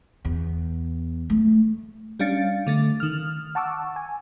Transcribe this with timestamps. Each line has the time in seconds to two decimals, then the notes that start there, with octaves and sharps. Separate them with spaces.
0.25 E2
1.30 A3
2.19 G3 C#4 D4 F5 A6 C#7
2.67 D3 A3 A6
3.00 D#3 F6
3.55 F#5 A5 C#6 D6 E6
3.96 G#5